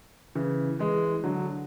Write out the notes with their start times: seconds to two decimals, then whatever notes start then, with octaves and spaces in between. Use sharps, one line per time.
0.35 C#3 E3
0.79 E3 G#3
1.24 D3 F#3